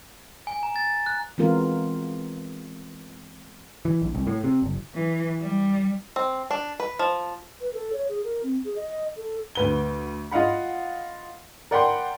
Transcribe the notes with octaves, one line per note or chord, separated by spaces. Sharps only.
G#5
A#5
A6
F#6
E3 G#3 B3 C4 F4 A#4
E3
A#1
C2
A2
C3
F#1
E3
G3
C4
D4
B4
F3
B4
A4
C#5
G#4
A#4
C4
G#4
D#5
A4
D2 B4 G7
F4 D#5 F5 F#5 B5
A#4 D5 F#5 G5 B5 C6